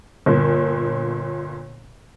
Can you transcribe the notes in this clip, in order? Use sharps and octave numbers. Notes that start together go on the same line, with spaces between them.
G1 A#2